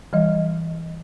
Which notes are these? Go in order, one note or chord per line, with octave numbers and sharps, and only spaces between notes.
E3 G3 D#5